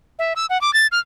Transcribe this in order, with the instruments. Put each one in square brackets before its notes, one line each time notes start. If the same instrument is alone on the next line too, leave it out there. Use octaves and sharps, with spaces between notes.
[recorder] E5
E6
F#5
D6
A6
F6